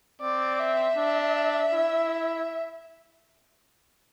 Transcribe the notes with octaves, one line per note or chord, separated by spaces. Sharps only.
C4 D5
E5
D4
E4